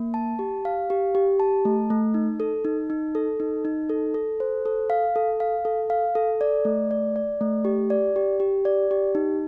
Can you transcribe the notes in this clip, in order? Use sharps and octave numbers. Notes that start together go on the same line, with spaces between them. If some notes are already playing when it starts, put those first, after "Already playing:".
Already playing: A#3
A5
G4
F5
G4
G4
A5
A3
A3
D#4
A4
D#4
D#4
A4
D#4
D#4
A4
A4
C5
A4
F5
A4
F5
A4
F5
A4
D5
A3
D5
D5
A3
G4
D5
G4
G4
D5
G4
D#4